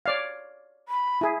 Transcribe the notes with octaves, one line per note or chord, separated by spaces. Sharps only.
C#5 D5 F5
B5
E4 G#4